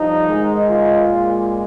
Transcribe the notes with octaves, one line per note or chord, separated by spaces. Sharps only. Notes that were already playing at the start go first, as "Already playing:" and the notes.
Already playing: G2 F3 D#4
G#2 D#3 G#3
F4
A#2 G#3